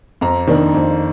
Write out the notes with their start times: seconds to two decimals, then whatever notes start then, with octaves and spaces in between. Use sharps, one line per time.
0.21 F2 A#5
0.47 D#3 A#3 D4
0.74 F2